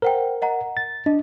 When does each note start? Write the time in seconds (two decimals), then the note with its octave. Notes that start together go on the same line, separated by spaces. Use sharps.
0.02 A#4 C5 F#5 G5
0.42 D#5 F#5 A#5
0.77 A6
1.06 D4 D#5